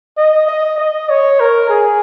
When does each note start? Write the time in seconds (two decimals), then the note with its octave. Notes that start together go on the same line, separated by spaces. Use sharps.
0.17 D#5
0.48 D#5
0.78 D#5
1.10 C#5
1.40 A#4
1.69 G#4